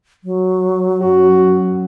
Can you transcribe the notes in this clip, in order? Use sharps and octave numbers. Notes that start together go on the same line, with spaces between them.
F#3
F#2 F#4